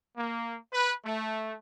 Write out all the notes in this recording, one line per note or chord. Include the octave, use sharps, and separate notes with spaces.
A#3
B4
A3